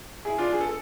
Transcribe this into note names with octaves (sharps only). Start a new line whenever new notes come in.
E4 G#4
D4 F4
G#4
A4